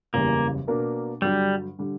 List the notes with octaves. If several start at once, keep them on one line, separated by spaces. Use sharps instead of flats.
F#1 E2 C#3 G3 A#3
B2 A#3 D4 A#4
G2 D3 F#3 G3
D3 G3